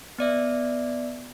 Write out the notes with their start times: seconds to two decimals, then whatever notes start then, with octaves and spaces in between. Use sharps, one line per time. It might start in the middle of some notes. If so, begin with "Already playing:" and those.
0.19 B3 D5 E5